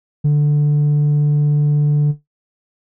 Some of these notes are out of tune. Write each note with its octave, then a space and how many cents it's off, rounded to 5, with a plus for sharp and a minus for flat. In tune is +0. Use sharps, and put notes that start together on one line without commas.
D3 +5